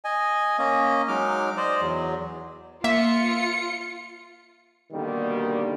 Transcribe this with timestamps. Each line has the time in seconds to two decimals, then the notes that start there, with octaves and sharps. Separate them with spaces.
0.05 D#5 G#5
0.58 A#3 C#4 D#5
1.08 F#3 G#3 D#4 D6 F6
1.57 C5 D5 D#5
1.81 E2 F#3
2.84 A#3 F4 E5 C#7
4.93 B2 D3 D#3 G3 A#3